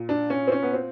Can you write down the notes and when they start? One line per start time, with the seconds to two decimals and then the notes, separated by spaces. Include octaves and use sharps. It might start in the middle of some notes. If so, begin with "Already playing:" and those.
Already playing: A#2
0.09 D4
0.30 C#4
0.47 C4
0.52 C#4
0.63 B3
0.73 C4